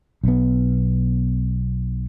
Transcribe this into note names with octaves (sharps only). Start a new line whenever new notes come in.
B1 B3